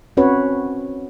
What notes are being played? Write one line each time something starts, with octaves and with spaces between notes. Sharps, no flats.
C4 C#4 F#4 B4 C#5